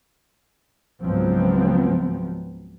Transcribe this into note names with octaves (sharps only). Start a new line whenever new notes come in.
C#2 G#2 F3 F#3 B3 C4